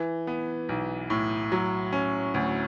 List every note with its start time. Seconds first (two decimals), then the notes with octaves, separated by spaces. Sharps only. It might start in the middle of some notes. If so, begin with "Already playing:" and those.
Already playing: E3
0.27 B3
0.69 B1
1.10 A2
1.52 F#3
1.93 C#4
2.34 D2